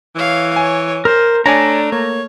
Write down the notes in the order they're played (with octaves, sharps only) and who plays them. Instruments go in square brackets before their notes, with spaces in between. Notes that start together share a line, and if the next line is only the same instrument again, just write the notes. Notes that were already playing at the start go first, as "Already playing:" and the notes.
[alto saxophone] E3 [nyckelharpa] C#5 F5
[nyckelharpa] C#5 [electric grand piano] G#5
[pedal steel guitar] A#4 [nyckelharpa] C5
[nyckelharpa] A3 [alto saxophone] D4 [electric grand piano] C#5 D5 G#5 [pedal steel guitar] A#5
[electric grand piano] A#3 [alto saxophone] C#5